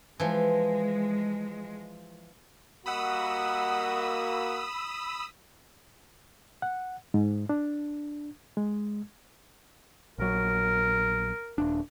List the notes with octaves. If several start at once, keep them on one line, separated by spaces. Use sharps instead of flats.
E3 F3 G#3
G3 A#3 F#4 D#5 F#5 B5 D#6 E6
F#5
G#2
D4
G#3
A#1 F#3 A#4
D#1 D4